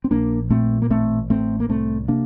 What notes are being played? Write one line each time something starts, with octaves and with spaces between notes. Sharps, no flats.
C4
A#1 A#3 D4
A#2 A3 C4
A#3
A1 A3 C4
A2 A3 C4
A#3
C2 A3 C4
C3 A#3 D4